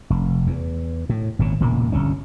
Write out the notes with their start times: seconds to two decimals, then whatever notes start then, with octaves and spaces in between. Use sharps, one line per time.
0.10 F1
0.47 E2
1.09 A2
1.39 G#1 A#2 C#3
1.60 E1 A#2 C#3 A#3
1.92 G1 C2 D3 C#4